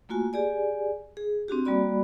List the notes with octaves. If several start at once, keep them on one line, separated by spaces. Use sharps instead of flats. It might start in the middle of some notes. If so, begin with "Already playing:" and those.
A3 A#3 F4 F#4 G#5
G4 G#4 D5 G#5
G#4
C4 D4 F#4 G4
G3 A#3 F#4 D5 B5